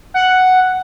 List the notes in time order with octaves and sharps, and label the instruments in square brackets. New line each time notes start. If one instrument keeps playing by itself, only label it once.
[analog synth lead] F#5